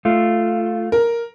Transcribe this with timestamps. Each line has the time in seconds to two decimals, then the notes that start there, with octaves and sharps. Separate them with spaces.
0.05 A3 F4
0.92 A#4